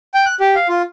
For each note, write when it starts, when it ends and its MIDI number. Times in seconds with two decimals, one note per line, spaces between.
0.14 0.25 79
0.26 0.35 90
0.40 0.55 67
0.55 0.68 77
0.69 0.82 65